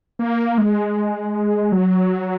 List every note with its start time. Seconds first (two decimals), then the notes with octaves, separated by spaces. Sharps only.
0.19 A#3
0.58 G#3
1.72 F#3